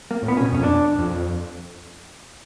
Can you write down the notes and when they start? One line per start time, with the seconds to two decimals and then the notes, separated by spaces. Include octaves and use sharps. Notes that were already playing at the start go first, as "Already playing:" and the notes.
0.11 A#3
0.22 A2
0.28 A#2 B3
0.37 C#4
0.40 B2
0.52 F2 C#4
0.63 D4
0.98 F2